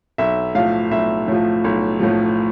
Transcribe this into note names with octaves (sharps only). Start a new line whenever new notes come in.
B1 E5
A2 F3 F5
B1 E5
A2 F3
B1
A2 F3